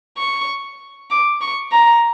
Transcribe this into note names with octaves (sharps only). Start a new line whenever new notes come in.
C#6
D6
C#6
A#5